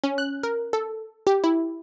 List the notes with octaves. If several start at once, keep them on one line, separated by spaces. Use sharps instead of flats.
C#4
F#6
A#4
A4
G4
E4